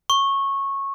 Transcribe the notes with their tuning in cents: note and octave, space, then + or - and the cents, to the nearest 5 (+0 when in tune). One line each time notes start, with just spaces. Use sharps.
C#6 -15